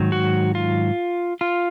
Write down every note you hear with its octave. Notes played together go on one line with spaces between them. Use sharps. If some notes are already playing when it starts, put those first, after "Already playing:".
Already playing: G#2 D#3 F#3
F#4
F4
F4